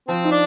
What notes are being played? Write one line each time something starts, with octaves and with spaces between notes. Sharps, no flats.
F3 C4
D#4
D4